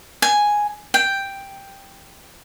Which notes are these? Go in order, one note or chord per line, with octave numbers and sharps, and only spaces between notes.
G#5
G5